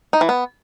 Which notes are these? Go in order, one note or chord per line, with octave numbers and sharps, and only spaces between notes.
D#4
E3
B3